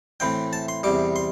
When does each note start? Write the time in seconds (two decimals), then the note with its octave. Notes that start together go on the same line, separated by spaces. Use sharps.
0.20 A2 E3 C4 G5
0.53 A5
0.68 C6
0.83 E2 C3 G3 D6
1.16 C6